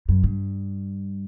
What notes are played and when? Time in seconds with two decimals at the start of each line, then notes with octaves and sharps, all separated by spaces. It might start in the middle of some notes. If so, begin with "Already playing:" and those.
0.09 F#2
0.24 G2